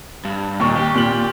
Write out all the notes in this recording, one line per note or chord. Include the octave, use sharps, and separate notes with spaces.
G2
D#2 A#2 C#6
G4
A#2 F#7